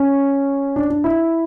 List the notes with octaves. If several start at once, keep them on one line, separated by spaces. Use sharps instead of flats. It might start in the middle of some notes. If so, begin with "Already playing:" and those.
Already playing: C#4
D4
D4
E4